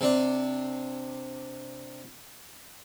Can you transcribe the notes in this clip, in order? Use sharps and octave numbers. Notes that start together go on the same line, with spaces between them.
C3 D4